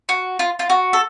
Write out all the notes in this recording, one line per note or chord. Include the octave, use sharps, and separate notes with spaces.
F#4
F4
F4
F#4
A4